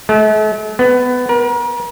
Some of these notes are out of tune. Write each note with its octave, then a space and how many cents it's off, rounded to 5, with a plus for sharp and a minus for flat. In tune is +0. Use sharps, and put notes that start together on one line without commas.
A3 -45
B3 +15
A#4 +40